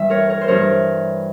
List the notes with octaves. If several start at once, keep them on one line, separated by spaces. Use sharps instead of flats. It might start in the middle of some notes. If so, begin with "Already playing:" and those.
Already playing: G2 E3 G3 E5
A#4 C#5
A#4 C#5
C5
G2 E3 G3 A#4 C#5